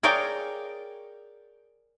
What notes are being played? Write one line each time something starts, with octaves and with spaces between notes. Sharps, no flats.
G#4 A#4 C#5 D5 F5 G5